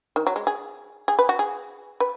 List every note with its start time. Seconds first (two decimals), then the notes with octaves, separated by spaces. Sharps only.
0.16 D#3
0.27 F#3
0.36 G#3
0.47 G#4
1.08 G#4
1.19 B4
1.29 F#4
1.39 G#4
2.00 B4